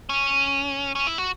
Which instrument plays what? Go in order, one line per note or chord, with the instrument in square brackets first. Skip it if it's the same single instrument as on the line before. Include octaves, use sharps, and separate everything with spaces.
[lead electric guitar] C#4
C#4
E4
F#4